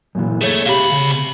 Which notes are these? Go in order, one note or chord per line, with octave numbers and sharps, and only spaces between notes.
F#2 A#2 E3
A3 G#4 C#5
C3 G4 F5 B5
C#3